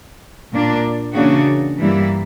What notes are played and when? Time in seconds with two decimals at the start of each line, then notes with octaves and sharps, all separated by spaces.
0.52 A#2 A#3 D4
1.15 C#3 E3 A#3 D4 F#4
1.79 G2 E3 G3 A#3 E4